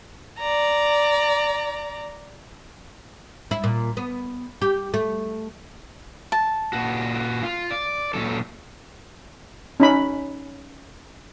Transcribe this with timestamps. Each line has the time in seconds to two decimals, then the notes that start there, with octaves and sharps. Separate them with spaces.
0.39 D5 A#5
3.51 E4
3.64 A#2
3.97 B3
4.61 G4
4.94 A3
6.32 A5
6.73 A#2 F#4
7.43 F4
7.71 D5
8.14 A#2 F#3 A4
9.80 C#4 D#4 B5